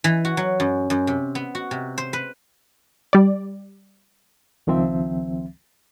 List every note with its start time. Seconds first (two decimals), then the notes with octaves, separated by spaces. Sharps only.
0.04 E3
0.25 F#4
0.37 F#3
0.60 F#2
0.90 F#2
1.07 C3
1.35 B3
1.55 F#4
1.71 C3
1.98 C5
2.13 B4
3.13 G3 D5
4.67 C#2 D#3 F3 C4 E5